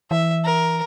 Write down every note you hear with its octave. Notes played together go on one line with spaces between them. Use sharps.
E3 E5
A#4